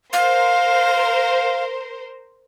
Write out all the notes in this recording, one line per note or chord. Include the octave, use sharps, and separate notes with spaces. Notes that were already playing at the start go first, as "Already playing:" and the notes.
A#4 C5 F5